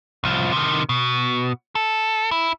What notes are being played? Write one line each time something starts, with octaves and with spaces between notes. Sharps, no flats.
C2 F3
C3 D#3
B2
A4
E4